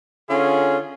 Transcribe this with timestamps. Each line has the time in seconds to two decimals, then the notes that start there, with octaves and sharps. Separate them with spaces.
0.30 D3 C#4 F4 G#4